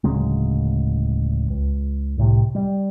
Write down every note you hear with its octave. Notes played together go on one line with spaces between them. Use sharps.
D1 C#3 F#3 G#3
C#2
C2 A2 C3
G3